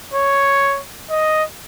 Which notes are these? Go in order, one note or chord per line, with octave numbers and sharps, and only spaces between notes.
C#5
D#5